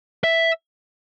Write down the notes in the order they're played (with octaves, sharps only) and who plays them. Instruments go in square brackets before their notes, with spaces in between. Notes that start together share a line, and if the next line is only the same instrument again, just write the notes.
[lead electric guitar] E5